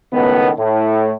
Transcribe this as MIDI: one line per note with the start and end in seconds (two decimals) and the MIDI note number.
0.13 0.49 37
0.13 0.49 45
0.13 0.49 51
0.13 0.49 59
0.58 1.13 45